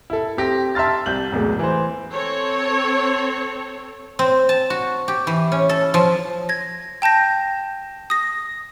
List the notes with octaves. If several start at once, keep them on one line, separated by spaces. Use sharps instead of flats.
E4 A4
C4 G4 A#6
E5 A5 C6 F6 A6
C2 G6 F#7
B1 E2 A2 G#3
E3 C5
C4 A4 C#5
C4
A5
F#4
G4
E3
C#4
A4
F3
G#6 A#6
G5 A5 G6 A#6
D#6 A#6